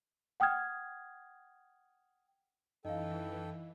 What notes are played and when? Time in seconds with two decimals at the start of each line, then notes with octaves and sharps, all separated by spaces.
0.40 F#5 G5 D#6 F6 G#6
2.85 F#2 E3 D#4 A4 D#5 F5 G5